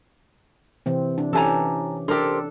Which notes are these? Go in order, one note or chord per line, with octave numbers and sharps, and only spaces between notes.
C3 E3 C4
D4
E3 C#4 G4 A4 G#5 A#5
D4 G4 A4 A#4 C5